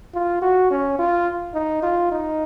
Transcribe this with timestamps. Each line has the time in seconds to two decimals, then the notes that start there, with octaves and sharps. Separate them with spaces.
0.14 F4
0.42 F#4
0.71 C#4
0.99 F4
1.54 D#4
1.83 F4
2.12 D#4